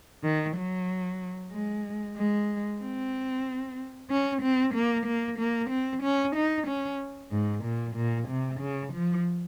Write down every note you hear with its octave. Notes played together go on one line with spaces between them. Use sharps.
D#3
F#3
G#3
G#3
C4
C#4
C4
A#3
A#3
A#3
C4
C#4
D#4
C#4
G#2
A#2
A#2
C3
C#3
F3